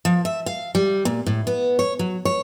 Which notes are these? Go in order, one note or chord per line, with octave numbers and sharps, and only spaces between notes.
F3
E5
F5
G3
A#2
A2
B3
C#5
F#3
C#5